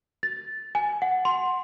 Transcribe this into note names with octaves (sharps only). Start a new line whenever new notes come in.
A6
G#5
F#5
C6